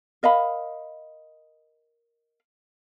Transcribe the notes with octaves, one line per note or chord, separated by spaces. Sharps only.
A#4 D#5 F5 B5